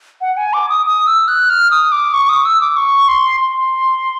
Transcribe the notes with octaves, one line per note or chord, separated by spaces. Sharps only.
F#5
G#5
D6
D#6
D#6
E6
F#6
F6
D#6
D6
C#6
D#6
E6
D6
C#6
C6
C6